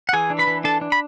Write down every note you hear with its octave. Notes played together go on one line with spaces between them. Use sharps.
F#5
E3 G#4 G#5
D4
B4 B5
E3
D4 A4 A5
D4
B5